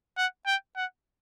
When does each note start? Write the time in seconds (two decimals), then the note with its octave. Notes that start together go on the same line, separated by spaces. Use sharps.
0.17 F#5
0.46 G5
0.76 F#5